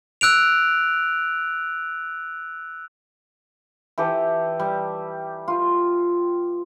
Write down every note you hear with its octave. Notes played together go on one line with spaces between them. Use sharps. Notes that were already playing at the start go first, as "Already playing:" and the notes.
E6 F#6 D7 F7
E3 G4 A4
G3
F4